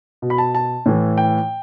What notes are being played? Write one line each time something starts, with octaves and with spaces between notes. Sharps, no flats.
B2
B5
A5
A5
A2 E3
G5